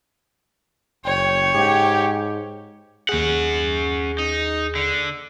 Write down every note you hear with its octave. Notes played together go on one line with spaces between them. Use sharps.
F#1 C#5 G5
G#2 G4
D#2 C#4 G#4 F#5
D#4
D3